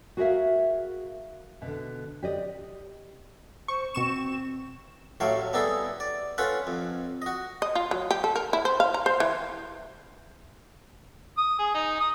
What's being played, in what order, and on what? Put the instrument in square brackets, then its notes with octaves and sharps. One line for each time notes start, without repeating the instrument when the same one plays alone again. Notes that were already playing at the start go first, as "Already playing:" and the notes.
[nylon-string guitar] F#4 G#4 A#4 C#5 E5 F5
B2 D3
G4 D5 D#5
[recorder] C5 [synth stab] C#6
[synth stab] B2 C#6 E7 [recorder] C4
[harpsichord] A1 A2 F#3 A3 F5 G5
G3 B3 D#4 E4 G#4 A4
D5
C#4 F4 A4 B4 F#5
F2
F#4 D#5
[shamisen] D#5
F4
F#3
G4
A4
A#4
E4
C5
F5
A#5
C5
E3
[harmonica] D#6
G#4
D#4
D#6